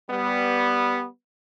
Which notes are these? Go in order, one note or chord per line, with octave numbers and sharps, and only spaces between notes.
G3 B3